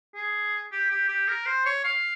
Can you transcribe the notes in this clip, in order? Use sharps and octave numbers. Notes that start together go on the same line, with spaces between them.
G#4
G4
G4
G4
A#4
C5
C#5
F5